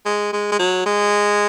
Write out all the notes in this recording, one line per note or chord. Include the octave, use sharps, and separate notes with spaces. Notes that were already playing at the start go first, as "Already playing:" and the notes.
G#3
G#3
G#3
F#3
G#3